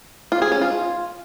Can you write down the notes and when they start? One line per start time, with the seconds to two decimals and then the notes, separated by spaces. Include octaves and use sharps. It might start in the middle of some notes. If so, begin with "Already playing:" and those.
0.32 F4
0.42 G#4
0.52 C#4
0.61 F4